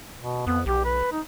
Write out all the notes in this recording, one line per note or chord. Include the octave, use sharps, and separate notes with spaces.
B2
F2 B3
B1 G4
B4
D#4